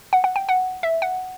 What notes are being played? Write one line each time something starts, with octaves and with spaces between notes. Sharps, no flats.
F#5
F#5
G5
F#5
E5
F#5